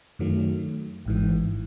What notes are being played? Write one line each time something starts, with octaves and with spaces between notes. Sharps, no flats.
F#2 D#3 F#3 A3
G#1 G#2 E3